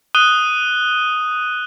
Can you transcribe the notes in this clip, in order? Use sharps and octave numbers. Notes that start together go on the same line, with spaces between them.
D#6 F#6 D#7 G7